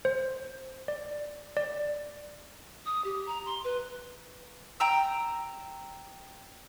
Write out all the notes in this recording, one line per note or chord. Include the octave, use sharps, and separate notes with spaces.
C5
D5
D5
D#6
G4
A#5
C6
B4
G5 A#5 E6